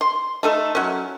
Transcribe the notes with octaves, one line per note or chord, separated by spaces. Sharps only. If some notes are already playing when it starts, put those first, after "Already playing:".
C6
A3 D#4 A4
F#3 C#4